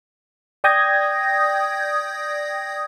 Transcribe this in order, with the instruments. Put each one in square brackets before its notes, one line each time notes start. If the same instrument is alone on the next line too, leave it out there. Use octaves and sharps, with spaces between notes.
[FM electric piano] D5 G5 D#6 G6 G#6 A#6